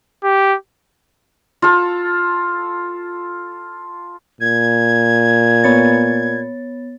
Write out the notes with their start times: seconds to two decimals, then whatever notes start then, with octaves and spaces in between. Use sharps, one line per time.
0.24 G4
1.62 F4 A4
4.41 A#2 G#6
5.64 B3 C#5 A6